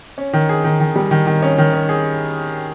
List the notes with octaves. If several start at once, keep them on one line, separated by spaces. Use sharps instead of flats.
C#4
D#3
G#4
D#3
D#3
G3
D#3
D#3
C#4
D#3
C#4
G#4